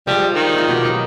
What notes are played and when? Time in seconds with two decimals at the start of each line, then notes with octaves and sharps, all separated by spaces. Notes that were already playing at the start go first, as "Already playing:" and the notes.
0.07 F3 G3 G#3
0.35 D#3
0.54 C4 D#4 F4
0.68 B2 F#4 G4
0.85 F#3 D#4